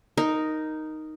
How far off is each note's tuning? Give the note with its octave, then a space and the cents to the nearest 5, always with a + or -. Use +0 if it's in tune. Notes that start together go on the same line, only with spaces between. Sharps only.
D#4 +0 A#4 +0